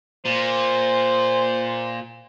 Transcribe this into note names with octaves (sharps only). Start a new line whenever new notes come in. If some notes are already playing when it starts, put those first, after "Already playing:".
A#2 C5